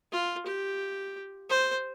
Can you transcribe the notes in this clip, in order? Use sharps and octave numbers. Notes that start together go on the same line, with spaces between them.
F4
G4
C5